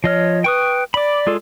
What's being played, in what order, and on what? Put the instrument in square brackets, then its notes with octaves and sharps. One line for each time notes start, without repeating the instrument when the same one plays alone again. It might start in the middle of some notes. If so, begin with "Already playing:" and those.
[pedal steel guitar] F3 D#5 F6 [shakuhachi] C#5
[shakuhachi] B4 [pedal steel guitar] G5 C#6 D#6
[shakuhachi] D5 [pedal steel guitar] B5 D6
[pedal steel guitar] G#3 F4 A4